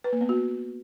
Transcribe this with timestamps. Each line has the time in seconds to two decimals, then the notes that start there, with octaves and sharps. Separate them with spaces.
0.04 B4
0.13 A#3
0.21 B3
0.29 F#4